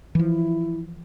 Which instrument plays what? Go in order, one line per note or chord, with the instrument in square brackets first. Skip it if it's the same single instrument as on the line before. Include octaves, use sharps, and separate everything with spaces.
[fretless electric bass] E3 F3 [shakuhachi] E4